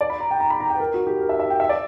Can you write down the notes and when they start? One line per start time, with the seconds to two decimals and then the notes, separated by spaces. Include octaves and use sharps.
0.01 D5
0.10 B5
0.20 A#5
0.31 G5
0.40 A#5
0.50 B5
0.60 A#5
0.70 G5
0.76 B4
0.80 A#4
0.94 F#4
1.07 G4
1.20 A#4
1.29 E5
1.40 E5
1.50 G5
1.60 E5
1.69 D5